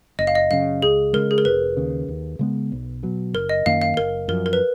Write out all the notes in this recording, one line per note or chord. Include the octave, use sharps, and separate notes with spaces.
F#1 D#5
F5
D#5
F#2 C#3 F5
C#2 G#4
C#3 G#3 A#4
G#4
A#4
F1 B4
D#2 C#3
D#2
C#3 G#3 B3
B1
B2 F#3
F#1 A#4
D#5
F#2 D#3 A#3 F5
F5
F#1 A#4
F#2 F3 A#4
A#4
B4